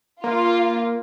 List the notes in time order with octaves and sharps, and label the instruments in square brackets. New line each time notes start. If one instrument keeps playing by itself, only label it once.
[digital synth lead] A#3 [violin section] F4